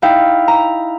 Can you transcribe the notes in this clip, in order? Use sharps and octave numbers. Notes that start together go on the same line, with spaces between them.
D#4 E4 F5 G5
A#5